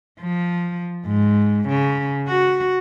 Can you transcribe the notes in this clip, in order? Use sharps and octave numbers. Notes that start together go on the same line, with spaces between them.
F3
G#2
C#3
F#4